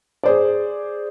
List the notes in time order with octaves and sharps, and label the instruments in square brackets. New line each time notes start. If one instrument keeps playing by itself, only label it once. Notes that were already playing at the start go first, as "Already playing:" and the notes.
[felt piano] G#4 C5 D5